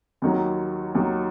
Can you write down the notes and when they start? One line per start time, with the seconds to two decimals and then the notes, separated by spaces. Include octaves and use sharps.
0.22 D#2 D#3 F#3
0.95 D#2 D#3 F#3